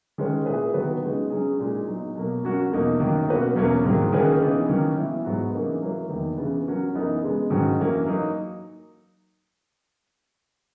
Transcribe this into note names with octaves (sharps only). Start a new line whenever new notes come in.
D#3 G#3 C#4 G#4 B4
A#2 A#3 E4 G#4 B4
D#3 F#3 B3 F#4 B4
C#3 G#3 B3 D#4
C#3 F#3 C#4 G#4
A#2 G#3 D#4
F#3 B3 D#4
B2 F#3 A#3
F#3 C#4 F#4 A#4
E2 B2 A#3 D#4
F#2 D#3 F#3 A#3
B2 A#3 C#4 F#4 B4
E2 B2 F#3 A#3 C#4
G#2 D#3 F#3 A#3
D#3 A#3 C#4 G#4 B4
C#3 E3 B3 D#4
D#3 F#3 A#3 C#4
E3 B3 E4
G#2 F#3 B3 F#4
C#3 E3 A#3 D#4 A#4
F#3 A#3 E4 B4
E2 D#3 A#3 D#4
C#3 E3 B3
F#3 C#4 F#4 A#4
F#2 E3 B3 D#4 A#4
C#3 G#3 B3
G#2 D#3 F#3 C#4 F#4
F#2 E3 A#3 C#4
F#3 A#3 D#4